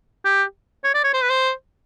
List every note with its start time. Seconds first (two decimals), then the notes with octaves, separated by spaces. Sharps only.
0.25 G4
0.84 C#5
0.94 D5
1.04 C#5
1.13 C5
1.22 B4
1.29 C5